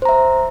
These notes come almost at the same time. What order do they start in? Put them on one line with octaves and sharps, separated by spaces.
C5 A#5 E5